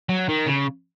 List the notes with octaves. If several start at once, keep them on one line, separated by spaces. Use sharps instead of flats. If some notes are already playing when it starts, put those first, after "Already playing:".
F#3
D#3
C#3